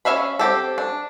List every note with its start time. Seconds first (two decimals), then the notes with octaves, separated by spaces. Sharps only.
0.05 C#4 C5 E5 F5 B5
0.39 C4 G4 A4
0.78 D4